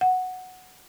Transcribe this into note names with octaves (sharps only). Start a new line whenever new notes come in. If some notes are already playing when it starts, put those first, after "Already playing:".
F#5